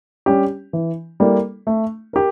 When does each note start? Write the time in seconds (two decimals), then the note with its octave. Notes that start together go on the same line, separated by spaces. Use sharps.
0.26 G3 C#4 G4
0.73 E3
1.20 G3 A#3 E4 A4
1.67 A3
2.13 G4 A#4